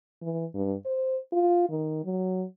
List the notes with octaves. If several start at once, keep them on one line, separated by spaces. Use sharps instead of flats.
E3
G2
C5
F4
D#3
F#3